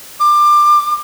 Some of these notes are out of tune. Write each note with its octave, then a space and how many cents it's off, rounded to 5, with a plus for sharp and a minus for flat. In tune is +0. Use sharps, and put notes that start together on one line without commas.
D6 +25